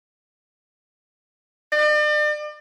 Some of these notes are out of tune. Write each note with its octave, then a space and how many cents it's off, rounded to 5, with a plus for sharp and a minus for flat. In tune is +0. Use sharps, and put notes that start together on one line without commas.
D5 +40